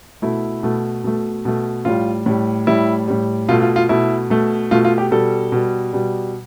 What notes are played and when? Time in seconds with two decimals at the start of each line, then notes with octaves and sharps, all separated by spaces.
0.22 B2 A3 E4
0.63 B2 A3
1.04 B2 A3
1.45 B2 A3
1.85 A2 G3 F4
2.26 A2 G3
2.67 A2 G3 E4
3.08 A2 G3
3.49 B2 A3 F4
3.62 F4
3.76 F4
3.89 B2 A3 E4
4.30 B2 A3
4.71 B2 A3 F4
4.85 F4
4.98 G4
5.11 B2 G3 A4
5.52 B2 G3
5.93 B2 G3